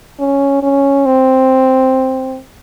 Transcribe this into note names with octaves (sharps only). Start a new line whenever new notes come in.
C#4
C#4
C4